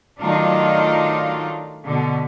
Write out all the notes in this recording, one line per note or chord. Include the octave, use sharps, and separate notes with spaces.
D#3 F#3 A3 D4 D#4 F4
B2 D3